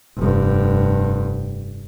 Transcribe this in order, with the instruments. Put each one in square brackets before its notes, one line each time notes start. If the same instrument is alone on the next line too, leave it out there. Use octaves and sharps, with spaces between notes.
[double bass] F1 G2